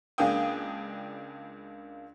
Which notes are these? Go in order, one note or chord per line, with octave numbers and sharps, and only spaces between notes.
C#2 A#3 D4 G#4 G5 D#6